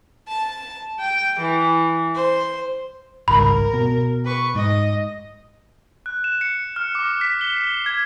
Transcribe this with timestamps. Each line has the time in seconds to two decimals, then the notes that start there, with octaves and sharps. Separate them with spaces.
0.30 A5
1.00 G5
1.40 E3
2.15 C5
3.28 G#1 C#2 G2 A#4 B5
3.74 B2
4.24 B4 C#6
4.55 G#2 D#5
6.06 F#6
6.24 E7
6.41 C#7
6.76 F6
6.95 D6
7.21 B6
7.41 G7
7.57 C7
7.86 G#6